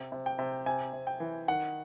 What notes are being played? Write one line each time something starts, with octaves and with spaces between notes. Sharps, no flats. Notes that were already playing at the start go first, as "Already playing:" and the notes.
Already playing: C3
C3
G5
C3
C3 G#5
C3
G5
E3
D#3 F#5